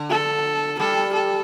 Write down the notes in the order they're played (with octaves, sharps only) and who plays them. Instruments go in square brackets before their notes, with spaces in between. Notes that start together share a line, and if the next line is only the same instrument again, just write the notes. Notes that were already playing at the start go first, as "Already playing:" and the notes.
Already playing: [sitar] D3
[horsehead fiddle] A4
[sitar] G3 [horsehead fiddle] A4
[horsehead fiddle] A4